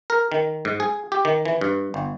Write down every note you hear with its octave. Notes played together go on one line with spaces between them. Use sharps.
A#4
D#3
G#2
G#4
G4
D#3
E3
G2
G1